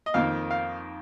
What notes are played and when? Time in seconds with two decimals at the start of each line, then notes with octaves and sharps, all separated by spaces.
0.06 D#5
0.14 F2 D#3 A#3 F5
0.50 F5